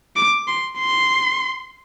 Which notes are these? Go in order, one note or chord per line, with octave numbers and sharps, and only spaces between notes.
D6
C6
C6